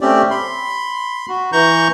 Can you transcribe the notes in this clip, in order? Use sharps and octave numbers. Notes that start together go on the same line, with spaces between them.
A3 C4 C#4 G4 D5
B5 C6
F#4
E3 A#5 C#6 G6